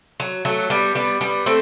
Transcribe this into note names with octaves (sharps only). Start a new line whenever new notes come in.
F#3
F#3 A3
G3 B3
G3 B3
G3 B3
A3 C4